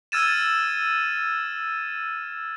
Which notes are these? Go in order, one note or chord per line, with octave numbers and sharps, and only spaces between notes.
E6 F6 G#6 A6 D#7 E7